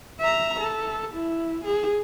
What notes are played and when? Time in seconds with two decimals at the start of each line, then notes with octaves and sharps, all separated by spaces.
0.20 E5 A#5
0.60 A4
1.15 E4
1.65 G#4